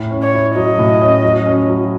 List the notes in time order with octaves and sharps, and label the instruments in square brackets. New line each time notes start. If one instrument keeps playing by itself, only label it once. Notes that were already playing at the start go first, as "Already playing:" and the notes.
Already playing: [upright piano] A2
C#4
[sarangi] C#5
[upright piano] E4
[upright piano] F#3 [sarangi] D#5
[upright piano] A2
C#4
F#3
C#4
F#3